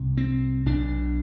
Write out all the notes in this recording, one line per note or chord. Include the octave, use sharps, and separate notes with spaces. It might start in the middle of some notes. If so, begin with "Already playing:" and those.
Already playing: C2 C3
C4
B1 B2 D4